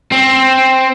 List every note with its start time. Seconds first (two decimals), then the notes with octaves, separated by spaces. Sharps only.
0.11 C4